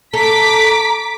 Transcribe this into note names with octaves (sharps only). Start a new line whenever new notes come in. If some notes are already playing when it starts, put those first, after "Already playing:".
A4 A#5 D6 B6